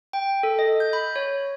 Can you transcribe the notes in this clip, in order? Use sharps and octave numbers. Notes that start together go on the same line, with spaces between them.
G5
A4
D#5
G6
B5
C#5